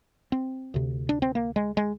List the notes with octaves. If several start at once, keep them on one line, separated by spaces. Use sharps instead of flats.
C4
D2 C3
D4
C4
A#3
G#3
G#3